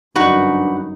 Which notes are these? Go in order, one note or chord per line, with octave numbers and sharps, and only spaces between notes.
G1 F#2 D4 D#4 F#4 B4